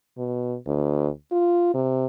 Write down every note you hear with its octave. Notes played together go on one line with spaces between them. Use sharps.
B2
D2
F4
C3